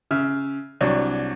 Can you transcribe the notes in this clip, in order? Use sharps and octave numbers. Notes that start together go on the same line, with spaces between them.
C#3 E5 F6
C2 F#3 D4 C#5